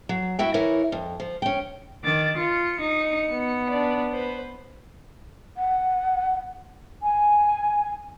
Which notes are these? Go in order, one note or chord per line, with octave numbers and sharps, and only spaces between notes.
F#3
E4 F#4 E5 G5
E3 E4 A#4 C#5
F2
F3
C#4 G5
D#3 D6 A6
F4 C#7
D#4
B3
D4 D5
B4 C5
F#5
G#5